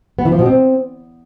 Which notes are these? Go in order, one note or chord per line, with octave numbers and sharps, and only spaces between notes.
B3
E3
F3
B2
C4